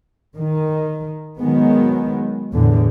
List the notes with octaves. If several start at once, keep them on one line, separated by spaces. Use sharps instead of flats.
D#3
D#3 F#3 G#3 B3
E2 A2 D3